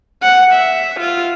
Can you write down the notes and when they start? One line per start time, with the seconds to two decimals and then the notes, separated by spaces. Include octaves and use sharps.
0.23 F#5
0.53 E5
1.00 F4